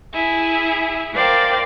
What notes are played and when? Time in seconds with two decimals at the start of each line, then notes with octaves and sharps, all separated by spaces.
0.13 E4 G#4 E5
1.13 A#4 C5 D5 F5 G5